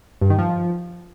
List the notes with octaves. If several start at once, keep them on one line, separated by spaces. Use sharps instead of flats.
G2
D#3
F3